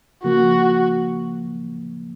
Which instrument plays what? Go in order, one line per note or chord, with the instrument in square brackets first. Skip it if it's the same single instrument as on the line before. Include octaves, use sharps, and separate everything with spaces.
[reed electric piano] C#3 F3 A#3 [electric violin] F#4